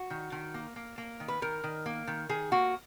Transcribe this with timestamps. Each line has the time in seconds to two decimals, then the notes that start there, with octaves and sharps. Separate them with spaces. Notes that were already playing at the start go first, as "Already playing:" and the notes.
Already playing: F#4
0.10 D#3
0.32 D#3
0.54 A#3
0.76 A#3
0.98 A#3
1.20 D#3
1.28 B4
1.42 D#3 A#4
1.64 D#3
1.86 A#3
2.08 D#3
2.29 D#3 G#4
2.52 A#3 F#4